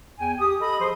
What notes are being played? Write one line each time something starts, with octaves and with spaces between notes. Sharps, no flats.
E2 G5 G#5
G4 D#6
A4 D#5 B5 D#6
F3 G#4 C5 C6 D#6